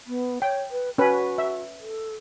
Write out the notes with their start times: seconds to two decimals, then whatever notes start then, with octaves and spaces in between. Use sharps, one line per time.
0.07 B3
0.42 C#5 G5
0.71 B4
0.98 C#4 F#4 B4
1.38 E5
1.81 A4